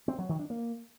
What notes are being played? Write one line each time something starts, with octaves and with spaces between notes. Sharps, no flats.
C4
F#3
D#3
D4
A#3